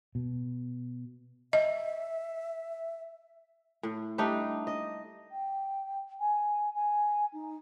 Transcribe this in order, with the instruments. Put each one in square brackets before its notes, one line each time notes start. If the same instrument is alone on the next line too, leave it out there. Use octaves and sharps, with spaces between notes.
[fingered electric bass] B2
[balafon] D#5 [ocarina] E5
[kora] A2
G3 A3 D4 D#4
D#5
[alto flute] G5
G#5
G#5
D#4